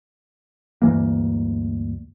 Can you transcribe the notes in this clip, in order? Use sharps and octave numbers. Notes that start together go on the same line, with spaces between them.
D2 G2 E3 A#3